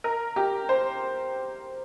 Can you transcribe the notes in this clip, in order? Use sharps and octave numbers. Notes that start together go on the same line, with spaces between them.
A#4
G4
C5